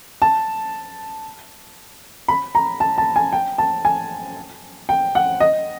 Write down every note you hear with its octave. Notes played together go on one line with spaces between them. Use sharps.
A5
B5
A#5
A5
A5
G#5
G5
A5
G#5
G5
F#5
D#5